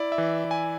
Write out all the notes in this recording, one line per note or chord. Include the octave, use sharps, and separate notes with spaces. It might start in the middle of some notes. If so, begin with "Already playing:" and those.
Already playing: E4 D5
E5
E3
E3
G#5